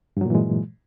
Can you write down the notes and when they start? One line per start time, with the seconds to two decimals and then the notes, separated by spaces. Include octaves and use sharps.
0.17 G2
0.21 F#3
0.26 A#2
0.30 E3
0.35 G#3